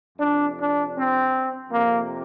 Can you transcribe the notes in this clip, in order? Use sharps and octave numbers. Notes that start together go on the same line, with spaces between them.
F2 C3 D4
D4
C4
F2 C3 A#3